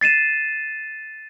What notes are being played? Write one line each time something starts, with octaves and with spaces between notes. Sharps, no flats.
A6 C7 D#7 E7